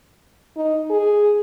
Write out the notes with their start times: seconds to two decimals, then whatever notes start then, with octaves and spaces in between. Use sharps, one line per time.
0.56 D#4
0.90 G#4